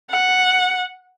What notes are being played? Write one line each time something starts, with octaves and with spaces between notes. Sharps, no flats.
F#5